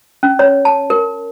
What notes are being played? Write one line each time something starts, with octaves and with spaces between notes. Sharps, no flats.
C#4
C#5
A5
A#4